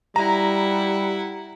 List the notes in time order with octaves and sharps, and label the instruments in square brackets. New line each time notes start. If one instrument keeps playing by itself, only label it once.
[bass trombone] G3 [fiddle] E4 F#5 [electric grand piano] A#5